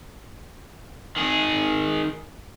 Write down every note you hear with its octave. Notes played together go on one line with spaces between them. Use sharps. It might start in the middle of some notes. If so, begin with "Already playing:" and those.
D#3 G#4